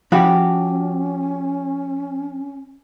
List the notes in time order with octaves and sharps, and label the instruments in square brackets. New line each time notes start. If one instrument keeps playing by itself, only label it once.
[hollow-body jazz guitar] F3 B5 [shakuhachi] C#4 [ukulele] F#4 G4